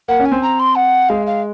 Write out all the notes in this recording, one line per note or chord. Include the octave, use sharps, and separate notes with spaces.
A#3 F#5
C#4
G#5
C4
A#5
C6
F#5
G#3 F5
F5